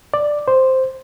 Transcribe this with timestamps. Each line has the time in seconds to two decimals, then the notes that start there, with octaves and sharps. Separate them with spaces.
0.14 D5
0.48 C5